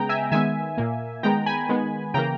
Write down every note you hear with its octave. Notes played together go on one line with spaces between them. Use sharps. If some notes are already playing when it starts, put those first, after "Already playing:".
Already playing: C#3 G#3 B3 G5 A#5
E5 G#5
D#3 G#3 B3 E5 G#5
A#2 A#3
D#3 G#3 B3 G5 A#5
G#5 B5
D#3 G#3 B3
C#3 E3 A#3 G5 A#5